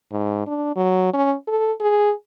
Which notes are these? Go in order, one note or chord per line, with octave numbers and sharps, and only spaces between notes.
G#2
D4
F#3
C#4
A4
G#4